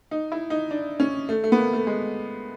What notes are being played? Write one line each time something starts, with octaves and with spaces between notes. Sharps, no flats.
D#4
E4
D#4
D4
C#4
A3
A3
B3
A#3
A3
G#3